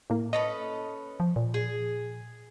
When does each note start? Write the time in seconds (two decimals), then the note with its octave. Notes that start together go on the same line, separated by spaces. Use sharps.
0.10 A2 A#3
0.33 C#4 A4 B4 D#5
1.20 F3
1.36 A#2
1.54 G#4